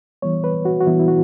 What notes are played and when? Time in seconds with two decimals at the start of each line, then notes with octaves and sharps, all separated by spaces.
0.22 E3 G3 B3 C#5
0.44 B4
0.65 F#4
0.81 F#4
0.87 E3 G3 B3 E4
1.00 E4
1.08 F#4